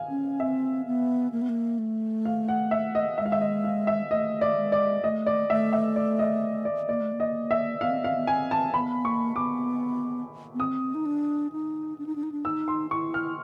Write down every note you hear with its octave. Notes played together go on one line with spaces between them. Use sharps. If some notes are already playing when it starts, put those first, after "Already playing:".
Already playing: F5 G#5
C#4
C4 E5
B3
A#3
B3
A#3
A3
F5
F#5
E5
D#5
G#3 E5
F5
E5
D#5
F5
E5
A3 D#5
D5
G#3
D5
A3 D#5
D5
A3 E5
E5
D5
D#5
D5
A#3 D5
A3
A#3
D#5
E5
B3 F5
C4
B3
C4 F5
B3
C4 G#5
A5
B3 B5
A#3 C#6
B3 D6
B3
C4 D#6
D#4
D4
D#4
D4
D#4
D4
D#4
D4
D#4 E6
C6
E4 C#6
F6